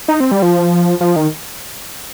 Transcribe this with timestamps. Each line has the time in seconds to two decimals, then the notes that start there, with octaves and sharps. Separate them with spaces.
0.08 D#4
0.20 C4
0.31 G3
0.42 F3
1.01 F3
1.16 D#3